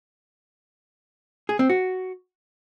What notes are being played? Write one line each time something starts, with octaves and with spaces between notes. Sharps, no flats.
G#4
C4
F#4